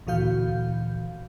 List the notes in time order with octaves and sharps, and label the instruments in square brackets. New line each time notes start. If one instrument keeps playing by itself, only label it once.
[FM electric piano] D2 A#2 E3 F#4 F5 G6